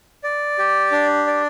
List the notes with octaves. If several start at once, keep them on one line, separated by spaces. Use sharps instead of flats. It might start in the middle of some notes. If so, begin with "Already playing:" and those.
D5
G4
D4
D5